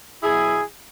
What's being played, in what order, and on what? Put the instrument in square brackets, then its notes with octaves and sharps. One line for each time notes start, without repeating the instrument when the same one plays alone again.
[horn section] B2 F#3 E4 G#4